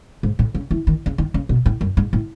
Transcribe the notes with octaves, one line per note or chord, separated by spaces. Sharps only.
G#2
A2
C#3
E3
D#3
C#3
D#3
C#3
B2
A2
F#2
G#2
A2